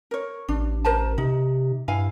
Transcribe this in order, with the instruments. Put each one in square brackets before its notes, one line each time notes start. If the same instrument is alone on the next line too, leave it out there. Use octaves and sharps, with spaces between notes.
[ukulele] A#4 C#5
[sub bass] A1 [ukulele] D4
[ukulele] A#4 C5 A5
[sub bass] C3 [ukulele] D#4
[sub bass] G2 [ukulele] E4 F5 G#5